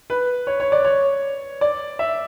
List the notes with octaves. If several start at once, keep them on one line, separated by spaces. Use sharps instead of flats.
B4
C#5
C#5
D5
C#5
D5
E5